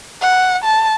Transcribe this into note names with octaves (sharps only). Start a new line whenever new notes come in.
F#5
A5